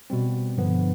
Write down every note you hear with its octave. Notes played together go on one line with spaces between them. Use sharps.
B2 G3 C4
G2 D3 F3 B3